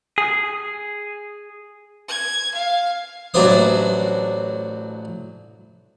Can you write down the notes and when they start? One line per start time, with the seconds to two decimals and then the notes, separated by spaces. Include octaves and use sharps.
0.18 G#4
2.08 G#6
2.55 F5
3.34 A1 F#3 A3 D4 C5 D#6